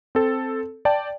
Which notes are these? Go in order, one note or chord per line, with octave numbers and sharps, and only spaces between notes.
C4 A4
D5 G5 A5